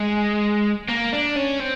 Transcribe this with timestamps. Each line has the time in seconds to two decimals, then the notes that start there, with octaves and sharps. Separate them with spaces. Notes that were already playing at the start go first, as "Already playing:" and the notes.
Already playing: G#3
0.89 A#3
1.13 D4
1.37 C#4
1.60 C4